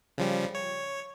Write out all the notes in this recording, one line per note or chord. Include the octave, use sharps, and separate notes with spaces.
C#3 F3 G3
C#5